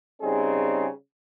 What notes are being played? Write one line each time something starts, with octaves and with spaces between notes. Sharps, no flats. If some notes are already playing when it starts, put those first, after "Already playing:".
C#3 G3 C4 D#4 G#4